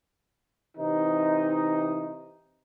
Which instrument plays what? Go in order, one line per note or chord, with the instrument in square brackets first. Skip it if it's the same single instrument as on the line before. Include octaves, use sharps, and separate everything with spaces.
[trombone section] C3 E3 D#4